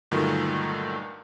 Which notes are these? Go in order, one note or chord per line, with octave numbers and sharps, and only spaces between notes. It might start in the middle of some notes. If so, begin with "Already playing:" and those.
G2 A#2 D3 D#3 F#3 A3